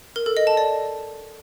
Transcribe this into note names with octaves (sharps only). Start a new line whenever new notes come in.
A#4
A4
D#5
A5
D5